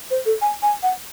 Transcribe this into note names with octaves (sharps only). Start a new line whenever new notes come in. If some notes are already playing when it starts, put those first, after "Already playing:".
C5
A4
G#5
G#5
F#5